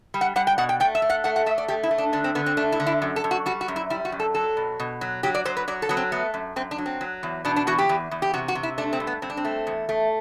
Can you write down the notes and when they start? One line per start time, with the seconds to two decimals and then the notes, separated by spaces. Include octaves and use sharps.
0.14 G3
0.21 F#5
0.36 G3 F#5
0.47 G5
0.58 B2 F#5
0.69 G5
0.80 A3 G5
0.95 E5
1.02 A3
1.10 F#5
1.24 A3 F#5
1.36 F#5
1.46 A3 E5
1.58 D5
1.68 A3 G4
1.83 E4
1.91 A3
1.98 D4
2.13 D3 D4
2.24 C4
2.35 D3 B3
2.46 C4
2.57 A3 D4
2.72 E4
2.80 D3
2.86 E4
3.02 F#2
3.16 A4
3.24 F#2
3.31 F#4
3.46 G3 F#4
3.61 F#4
3.68 F#2
3.76 E4
3.90 G3 E4
4.05 F#4
4.12 F#2
4.20 A4
4.34 F#3 A4
4.57 B2
4.80 B2
5.01 F#3
5.23 F#3 G4
5.35 D5
5.45 F#3 C5
5.57 B4
5.68 F#3 D5
5.82 A4
5.89 F#3 B3
5.97 C4
6.12 A3 B3
6.34 F#2
6.56 F#2 C4
6.71 D4
6.78 F#3
6.86 C4
7.01 F#3
7.23 E2
7.45 B2 D4
7.56 D4
7.67 E2 F#4
7.78 G4
7.89 E2
8.11 E2
8.22 G4
8.34 C3 F#4
8.48 F#4
8.55 C3
8.63 E4
8.78 A3 D4
8.93 C4
9.00 G2
9.07 B3
9.22 G2 C4
9.30 D4
9.37 C4
9.45 A3
9.67 E2
9.89 A3